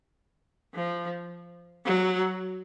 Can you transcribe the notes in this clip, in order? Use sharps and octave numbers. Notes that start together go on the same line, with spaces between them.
F3
F#3